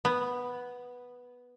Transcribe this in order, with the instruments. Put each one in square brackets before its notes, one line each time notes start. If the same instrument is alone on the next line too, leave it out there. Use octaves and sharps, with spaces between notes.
[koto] B3